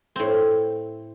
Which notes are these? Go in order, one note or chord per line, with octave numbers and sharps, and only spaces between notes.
A2 C4